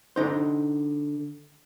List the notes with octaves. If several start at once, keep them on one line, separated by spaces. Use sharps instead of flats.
D3 D#4 C5